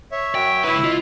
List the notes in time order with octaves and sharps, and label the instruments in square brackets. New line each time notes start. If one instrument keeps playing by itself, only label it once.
[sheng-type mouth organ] C#5 E5
[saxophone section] F#2 [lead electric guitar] G5
[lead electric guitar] C#2 B4 [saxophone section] E4
[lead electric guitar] F4 [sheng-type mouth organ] D#5